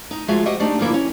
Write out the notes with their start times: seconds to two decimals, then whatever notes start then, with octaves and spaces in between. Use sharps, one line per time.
0.11 D#4
0.28 F3 G#3 F4 F#4 E5
0.46 F#4 G4 C5 D#5 E5 F#5
0.60 A3 D4 D#4 G4 C5 D5
0.79 D2 G2 F3 G3 A#3 E4
0.94 C#4